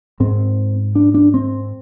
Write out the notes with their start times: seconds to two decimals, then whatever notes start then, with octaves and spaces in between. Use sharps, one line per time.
0.20 G#2 C4
0.95 D4
1.14 D4
1.34 C4